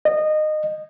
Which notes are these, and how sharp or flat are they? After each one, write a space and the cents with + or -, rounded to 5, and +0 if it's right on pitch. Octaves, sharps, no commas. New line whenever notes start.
D#5 -20